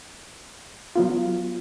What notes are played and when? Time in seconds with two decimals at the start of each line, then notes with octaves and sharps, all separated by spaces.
0.95 F#3 B3 F4